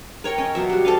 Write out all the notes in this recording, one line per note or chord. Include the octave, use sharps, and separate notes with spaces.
A#4 C#5 G5 C#6
C#4 D#5
B2 F#3 E5
G3 F#4
A4 C5 D#5 F5